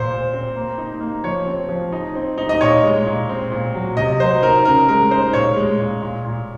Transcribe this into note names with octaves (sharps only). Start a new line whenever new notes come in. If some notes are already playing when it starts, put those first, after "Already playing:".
Already playing: A#2 C5
A#2
C4
A#3
D#4
A#3
F3 C#5
C4
F3
D#4
C4
D#4
D#5
A#2 C#5
G#3
A#2
C4
A#2
F#3
C3 D#5
F#3 C5
D#4 A#4
C#3 A#4
G#3 A#4
D#4 C5
A#2 C#5
G#3
A#2
A#2
A#2